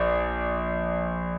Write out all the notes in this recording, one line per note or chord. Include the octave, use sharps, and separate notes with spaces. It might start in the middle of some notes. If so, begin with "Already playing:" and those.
Already playing: A#1 D5